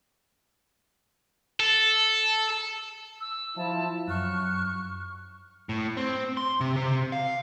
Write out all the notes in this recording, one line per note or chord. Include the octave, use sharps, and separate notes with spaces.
A4
E6
F3 E4 A5
F#2 C#6 F6 F#6
A2
C4
C6
C3
C3
F5